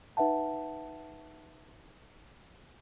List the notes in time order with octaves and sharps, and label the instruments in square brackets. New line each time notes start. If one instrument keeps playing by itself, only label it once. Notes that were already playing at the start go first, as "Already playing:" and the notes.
[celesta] D#4 B4 E5 F#5 A5